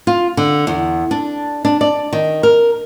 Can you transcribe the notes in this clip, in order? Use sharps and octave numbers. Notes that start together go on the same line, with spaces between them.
F4
D3
E2
D4
D4
D5
D#3
A#4